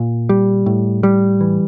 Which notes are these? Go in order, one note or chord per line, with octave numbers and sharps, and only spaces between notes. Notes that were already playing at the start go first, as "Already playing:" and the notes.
Already playing: A#2
G3
A2
G3
E3